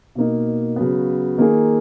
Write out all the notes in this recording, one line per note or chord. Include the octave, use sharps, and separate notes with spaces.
B2 A#3 D#4
C#3 F#3 B3
D#3 A#3 F4 G#4